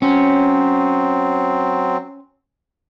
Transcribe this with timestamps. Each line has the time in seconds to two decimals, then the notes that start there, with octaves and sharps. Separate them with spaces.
0.02 F#3 C4 C#4